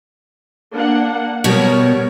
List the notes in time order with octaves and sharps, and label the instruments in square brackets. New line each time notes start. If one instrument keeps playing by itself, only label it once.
[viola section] A#3 D4 F#5
[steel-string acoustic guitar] B2 G3 [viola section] B3 A#4 C#5